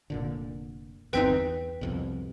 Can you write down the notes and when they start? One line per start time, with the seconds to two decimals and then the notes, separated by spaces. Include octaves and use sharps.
0.10 F1 A#2 D3
1.13 G1 E2 C4 D#4 B4 G5 B6
1.81 C2 F2 B2